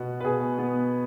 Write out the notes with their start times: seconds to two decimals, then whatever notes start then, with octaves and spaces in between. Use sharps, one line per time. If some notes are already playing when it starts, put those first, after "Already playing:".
Already playing: B2 B3 F#4
0.20 B4
0.24 B2 G#4
0.59 B3